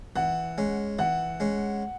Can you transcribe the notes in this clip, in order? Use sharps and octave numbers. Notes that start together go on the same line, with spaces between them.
E3 F#5
G#3 C#4
E3 F#5
G#3 C#4